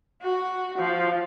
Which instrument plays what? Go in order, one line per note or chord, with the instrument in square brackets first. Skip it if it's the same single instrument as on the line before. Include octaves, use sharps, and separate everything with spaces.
[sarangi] F#4
F3